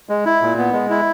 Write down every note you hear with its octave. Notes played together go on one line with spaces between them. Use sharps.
G#3
E4
A#2
B3
G#3
E4